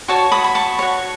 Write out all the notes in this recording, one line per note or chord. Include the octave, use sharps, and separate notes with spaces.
F#4 C#5 A5 C#6
B5 D#6
B5
A5 C#6
F#4 C#5